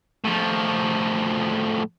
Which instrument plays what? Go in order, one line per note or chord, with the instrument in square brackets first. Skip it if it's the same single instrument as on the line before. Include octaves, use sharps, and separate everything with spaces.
[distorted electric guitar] A2 F3